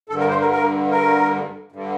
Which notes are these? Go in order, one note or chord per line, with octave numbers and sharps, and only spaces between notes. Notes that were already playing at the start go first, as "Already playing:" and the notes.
G2 D3 A4
A#4
C5
A#4
A#4
A#4
G2 D3